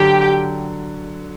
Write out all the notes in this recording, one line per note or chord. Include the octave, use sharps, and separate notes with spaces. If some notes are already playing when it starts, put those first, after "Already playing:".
Already playing: D3 F#3 G4 G5